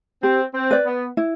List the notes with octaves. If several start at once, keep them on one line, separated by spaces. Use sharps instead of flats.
C4 G4
C4
B4 D5
B3
E4